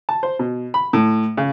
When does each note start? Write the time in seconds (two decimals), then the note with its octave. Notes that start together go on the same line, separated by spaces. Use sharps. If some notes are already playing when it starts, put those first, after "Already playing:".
0.09 A5
0.23 C5
0.39 B2
0.74 B5
0.93 A2
1.37 C#3